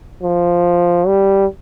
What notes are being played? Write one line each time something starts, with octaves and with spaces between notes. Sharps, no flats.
F3
G3